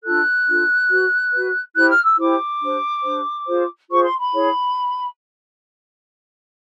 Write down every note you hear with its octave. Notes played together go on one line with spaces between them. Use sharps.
D4 F4 A4 F#6
D4 F4 A4
F#4 B4
F#4 B4
E4 G4 C5 F#6
F6
E6
E4 G4 C5 D6
D4 G4 C5
D4 G4 C5
F4 G#4 C5
F4 G#4 C5 C#6
C6
B5
E4 G#4 C#5